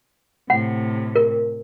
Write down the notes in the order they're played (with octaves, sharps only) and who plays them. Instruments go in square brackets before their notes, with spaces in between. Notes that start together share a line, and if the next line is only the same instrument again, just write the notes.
[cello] A2 C3 [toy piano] F#5
[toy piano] A#4